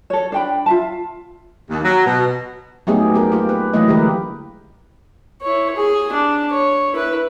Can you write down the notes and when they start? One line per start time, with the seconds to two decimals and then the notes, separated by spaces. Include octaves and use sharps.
0.10 A4 C#5
0.32 D4 G5 B5
0.66 F4 E5 A5
1.69 D#2
1.83 F#3
2.04 B2
2.87 F#3 A3 B3 D#4 G4 G#4
3.14 B3 G4 A#4
3.32 A#3 F4 G4
3.49 B4
3.74 E3 F#3 A3 A#3 E4 D#5
3.88 D3 G#3 G4 A#4 B4
5.42 E4 C#5
5.76 G#4
6.12 D4
6.51 C#5
6.93 E4 B4